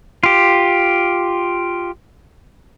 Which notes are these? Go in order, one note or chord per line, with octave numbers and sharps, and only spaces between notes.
F4 G4